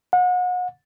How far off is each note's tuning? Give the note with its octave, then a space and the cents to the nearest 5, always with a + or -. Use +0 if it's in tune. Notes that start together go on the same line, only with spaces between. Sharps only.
F#5 -35